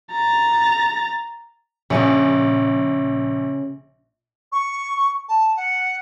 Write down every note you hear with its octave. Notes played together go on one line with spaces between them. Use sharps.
A#5 A6
A#1 C#3 D5 G#5
C#6
A5
F#5